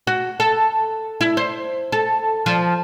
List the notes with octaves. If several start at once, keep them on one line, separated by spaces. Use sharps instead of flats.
F#4
A4
E4
C5
A4
F3